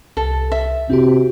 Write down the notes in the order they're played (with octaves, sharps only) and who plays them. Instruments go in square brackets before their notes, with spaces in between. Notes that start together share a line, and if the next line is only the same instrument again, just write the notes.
[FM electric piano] C2 [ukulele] A4
[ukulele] E5
[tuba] C3 [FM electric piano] C4 E4 G4 [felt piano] F#4